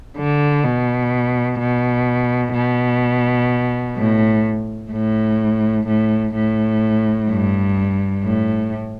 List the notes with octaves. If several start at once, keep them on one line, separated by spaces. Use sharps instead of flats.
D3
B2
B2
B2
A2
A2
A2
A2
G2
A2